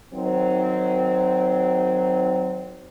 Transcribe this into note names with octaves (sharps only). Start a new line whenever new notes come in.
D#3 F#3 C4